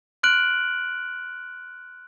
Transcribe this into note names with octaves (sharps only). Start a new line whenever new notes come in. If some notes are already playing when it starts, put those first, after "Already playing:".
C6 F6 F#6 D7 F#7